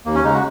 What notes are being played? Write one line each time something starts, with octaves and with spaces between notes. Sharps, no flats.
D#2 A#3
C#4
C#3 G#3 D#4
F#4